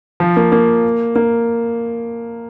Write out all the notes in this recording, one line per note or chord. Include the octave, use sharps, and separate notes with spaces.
F3
A#3
A#3
A#3